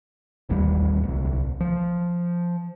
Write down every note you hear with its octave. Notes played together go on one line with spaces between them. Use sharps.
E1 A1 D#2 G3
D1 C2
F3